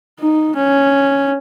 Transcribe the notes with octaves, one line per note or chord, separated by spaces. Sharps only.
D#4
C#4